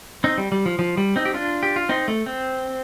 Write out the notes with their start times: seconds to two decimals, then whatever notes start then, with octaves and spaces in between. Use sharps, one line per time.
0.24 C4 D#4
0.38 G3
0.52 G3
0.66 F3
0.79 F3
0.97 G3
1.16 C4 D#4
1.25 G4
1.34 D4 F4
1.63 G4
1.76 F4
1.89 C4 D#4
2.08 A3
2.26 C4